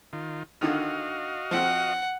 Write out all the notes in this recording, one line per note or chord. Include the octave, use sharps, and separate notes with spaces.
D#3 F4
D3 D#3 F4 F#4 D#5 F5
F3 C4 F#5